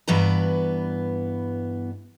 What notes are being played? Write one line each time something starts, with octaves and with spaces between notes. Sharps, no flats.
G2 E3 B3 B4 A#5